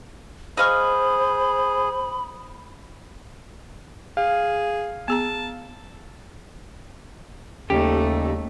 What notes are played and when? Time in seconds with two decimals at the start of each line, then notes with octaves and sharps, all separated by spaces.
0.57 G#4 C5 D#5 F5 B5 C#6
4.17 G#4 F5
5.08 B3 G#4 A5 A#5
7.70 D#2 C#3 G3 A3 D#4 G4 A4